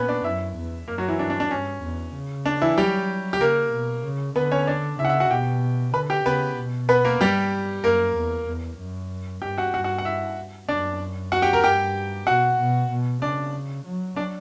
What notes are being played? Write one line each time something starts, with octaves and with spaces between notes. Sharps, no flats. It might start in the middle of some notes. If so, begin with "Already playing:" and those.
Already playing: A#2 B3 C#4 B4 C#5
D4 D5
F#2 E4 E5
E2
F#2 A#3 A#4
F#3 F#4
E3 E4
G2 D4
D4
D4
G2 C#4
E2
C#3
D4
E3 E4
F#3 G3 G4
G4
C#3 A#3 A#4
B2
C#3
D3 B3 B4
C#4 C#5
D4 D5
C#3 E4 E5
F#5
E4 E5
F#4 F#5
B2 G4 G5
D3 B4 B5
G4 G5
C#3 B3 B4
B2
B3 B4
A#3 A#4
G2 G3 G4
F#2 A#3 A#4
E2
E2
F#2
G2 G4 G5
F#4 F#5
G2 F#4 F#5
F#4 F#5
F#5
E4 E5
F#2 D4 D5
F#4 F#5
G4 G5
A#4 A#5
G2 G4 G5
B2 F#4 F#5
B2
B2
C#3 D4 D5
F#3
D4 D5